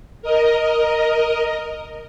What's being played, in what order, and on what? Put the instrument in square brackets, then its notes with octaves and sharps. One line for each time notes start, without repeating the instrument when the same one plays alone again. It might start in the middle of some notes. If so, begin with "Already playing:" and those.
[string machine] A#4 D#5